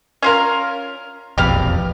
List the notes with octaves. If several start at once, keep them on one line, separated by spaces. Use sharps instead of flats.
C#4 F4 A#4
E1 A#1 F2 G4 B4 F5